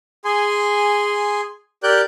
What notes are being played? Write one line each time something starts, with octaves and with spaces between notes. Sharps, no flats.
G#4 G#5 C6
G4 A#4 D5 F#6 G6